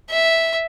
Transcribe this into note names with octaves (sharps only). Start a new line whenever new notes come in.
E5